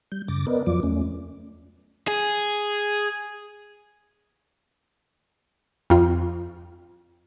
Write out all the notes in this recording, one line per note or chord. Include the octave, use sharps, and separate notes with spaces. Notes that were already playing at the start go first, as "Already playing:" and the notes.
G3 G6
F#2 C#3 D6 A6 A#6
B3 A#4 B4 D5 D#5
F2 F3 F#3 F4 D5 D6
E2 A3 C#4
G#4
F2 F4